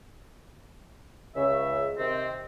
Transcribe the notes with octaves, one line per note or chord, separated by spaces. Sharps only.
C#2 C#3 E5
C3 D#3 C4